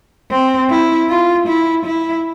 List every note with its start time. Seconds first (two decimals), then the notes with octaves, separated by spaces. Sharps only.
0.31 C4
0.70 E4
1.09 F4
1.47 E4
1.86 E4